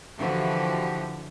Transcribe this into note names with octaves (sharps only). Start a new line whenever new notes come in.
D3 E3 F3 F#4 G4